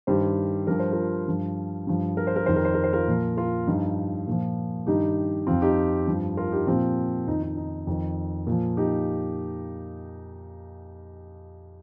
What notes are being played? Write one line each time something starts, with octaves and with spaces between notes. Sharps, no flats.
G2 D#3 G4 C5
G2 F3 A#4
C5
F4 A#4
G2 F3
G2 F3
A#4
C5
A#4
F2 D#3 C5
A#4
C5
A#4
C5
F4 A#4
A#2 F3
F4 A#4
G2 F3 D#4
A#2 F3
G2 D#3 D#4 G4
F2 F3 C4 F4
D#4 G4
G2 F3
F4 A#4
D#4 G4
A#2 F3 C4 F4
F2 D#3 D#4
D#4
D#4
F2 D#3
A#2 F3
D#4 G4